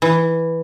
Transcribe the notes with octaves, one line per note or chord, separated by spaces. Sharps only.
E3